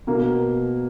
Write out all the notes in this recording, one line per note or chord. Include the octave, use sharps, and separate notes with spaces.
B2 A#3